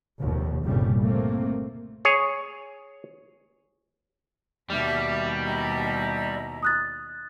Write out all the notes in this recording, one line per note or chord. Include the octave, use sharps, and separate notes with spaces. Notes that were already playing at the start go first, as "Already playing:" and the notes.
F1 D#2 G#2 B2
G1 C2 A#2 C#3 G3
A3 A#3 C4
G#4 C#5
D#2 B2 G3 E5 D6 F6
E4 D#5 A#5
D#6 F#6 A6